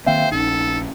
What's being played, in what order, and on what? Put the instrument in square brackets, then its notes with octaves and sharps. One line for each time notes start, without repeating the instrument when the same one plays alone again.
[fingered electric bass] D#3 A#3 C4 [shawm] C5 [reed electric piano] E5 F5 G5
[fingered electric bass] A#1 C#4 [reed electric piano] D#4 [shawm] A4